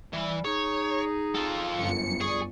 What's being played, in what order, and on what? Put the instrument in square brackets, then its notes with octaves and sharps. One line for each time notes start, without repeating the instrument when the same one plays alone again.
[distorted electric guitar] E3 E5 [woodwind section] G3
[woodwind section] D#4 G#4 [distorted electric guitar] C#5
[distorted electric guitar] F4 A4
[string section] G1 F#2 C#7
[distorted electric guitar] G#4 [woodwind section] D5 C#6